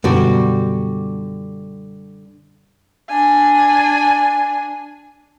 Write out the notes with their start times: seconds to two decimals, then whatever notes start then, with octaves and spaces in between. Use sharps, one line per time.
0.04 F#2 B2 D3 G3 B3 F#4
3.09 D4 G#5